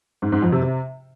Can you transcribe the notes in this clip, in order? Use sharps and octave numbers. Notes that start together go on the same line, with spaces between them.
G#2
G#2
F2
C3
C3